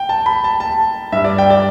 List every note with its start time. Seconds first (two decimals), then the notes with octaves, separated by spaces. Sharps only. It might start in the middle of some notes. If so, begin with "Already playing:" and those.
Already playing: G5
0.09 A5
0.26 B5
0.44 A5
0.60 A5
1.12 G2 G3 D4 E5
1.24 D5
1.38 G5
1.50 D5